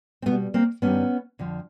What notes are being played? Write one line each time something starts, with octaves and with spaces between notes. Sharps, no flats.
C4
B2 A3 B3
G3
A#3 C4
G2 D#3 G3 B3 C#4
F2 D3 F3